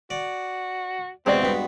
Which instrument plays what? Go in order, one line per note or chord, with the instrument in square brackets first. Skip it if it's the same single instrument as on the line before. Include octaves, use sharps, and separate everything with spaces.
[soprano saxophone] F#4 [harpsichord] D5
[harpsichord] E2 C3 [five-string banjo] G#3 F#4 D5 [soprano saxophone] C4
[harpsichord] G2 B3